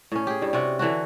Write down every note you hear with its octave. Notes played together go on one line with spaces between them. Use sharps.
A2 C#4
G4 G#4
G2 G3
C3 C#4 F#4 D5
D3 E3 D4 F#4